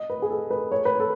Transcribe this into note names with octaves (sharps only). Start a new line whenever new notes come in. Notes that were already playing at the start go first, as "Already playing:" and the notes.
Already playing: D#5
B4
G#4
A4
B4
C#5
B4
A4